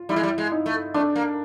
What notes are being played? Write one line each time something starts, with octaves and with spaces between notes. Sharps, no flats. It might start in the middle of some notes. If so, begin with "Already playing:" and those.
Already playing: F4
G3 E4
G#3
G3
G#3
D#4
A3
A3 D4
A#3